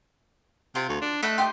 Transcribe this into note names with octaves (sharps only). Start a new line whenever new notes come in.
C3 F4
D2
D4
A3 D#5 E6 F#6
D#4 G4 C6